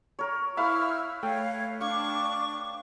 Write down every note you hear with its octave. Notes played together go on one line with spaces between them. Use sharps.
A#4 C#5
E4 B4 C#5 E5 F5 E6 F6
A3 C#5 F5 G5
D4 F5 C#6 D6